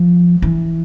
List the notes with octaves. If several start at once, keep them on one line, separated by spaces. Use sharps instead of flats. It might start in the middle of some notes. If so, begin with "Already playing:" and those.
Already playing: F3
E3